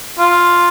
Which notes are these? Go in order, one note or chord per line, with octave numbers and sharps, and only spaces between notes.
F4